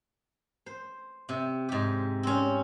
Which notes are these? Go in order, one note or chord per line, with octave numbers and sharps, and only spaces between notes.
C5
C3
G#2 G4
C4 C#4